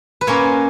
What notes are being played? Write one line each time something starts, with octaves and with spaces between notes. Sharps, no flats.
B4
A#2 A#3 C#4 C#5